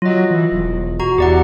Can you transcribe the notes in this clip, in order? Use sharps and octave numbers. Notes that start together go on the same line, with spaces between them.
F#3 F4 D#5
E3
E1
F#4 A#5
E2 G4 D5 F#5